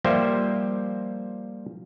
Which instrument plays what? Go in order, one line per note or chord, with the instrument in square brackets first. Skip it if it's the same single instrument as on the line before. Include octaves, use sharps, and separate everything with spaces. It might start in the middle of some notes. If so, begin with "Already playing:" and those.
[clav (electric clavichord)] F3 G3 A#3 G4 C5 E5